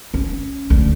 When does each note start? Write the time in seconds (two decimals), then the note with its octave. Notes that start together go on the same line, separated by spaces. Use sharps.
0.14 C#4
0.70 D2